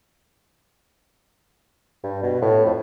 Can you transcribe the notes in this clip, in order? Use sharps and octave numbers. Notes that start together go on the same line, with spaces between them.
G2
B2
A2
F2